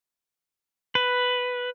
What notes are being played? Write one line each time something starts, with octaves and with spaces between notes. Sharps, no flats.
B4